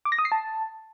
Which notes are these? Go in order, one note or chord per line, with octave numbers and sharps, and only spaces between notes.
D6
A#6
D#6
C7
A5